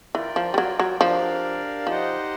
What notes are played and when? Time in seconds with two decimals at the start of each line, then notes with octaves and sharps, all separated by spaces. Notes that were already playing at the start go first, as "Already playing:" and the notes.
0.15 E3 F4 A#4 D5 G5
0.36 F3
0.54 G3
0.58 F#3
0.80 F#3
1.01 F3 D4 G4 A#4 D5 F5
1.86 F3 D#4 G4 C5 D#5 F#5